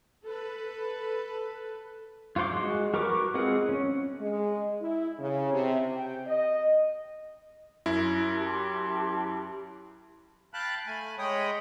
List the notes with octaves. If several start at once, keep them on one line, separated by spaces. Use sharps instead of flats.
A4 B4
F4 F#4 C5 C6 D6
G#3 F#4
F#4 A#4 B4 C#6 D6
G#3 C4 F4 G#4 F#5
C#4
G#3
E4
C#3
C3
G5
D#5
F#2 E4
G4 A5 C6
F5 G5 A5 B5 F#6
A3 G#5 B5
G#3 C#5 D#5 G5 B5 D#6